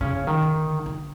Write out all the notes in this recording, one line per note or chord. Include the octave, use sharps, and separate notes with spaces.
C#3 C#4
D#3
D3
D3